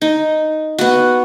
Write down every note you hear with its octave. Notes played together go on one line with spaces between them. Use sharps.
D#4
B3 F#4